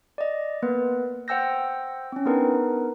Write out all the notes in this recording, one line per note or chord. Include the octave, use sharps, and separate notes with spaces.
D5 D#5
A#3 B3 B4
C5 F#5 G5 E6 G6 A#6
C4 C#4
B3 D4 D#4 G#4 A#4 B4